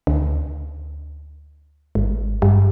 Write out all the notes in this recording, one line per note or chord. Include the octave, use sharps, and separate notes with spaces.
D2
G#1
G2